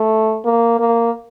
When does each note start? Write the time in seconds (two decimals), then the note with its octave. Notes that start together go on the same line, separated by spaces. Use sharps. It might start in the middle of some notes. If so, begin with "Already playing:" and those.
Already playing: A3
0.45 A#3
0.79 A#3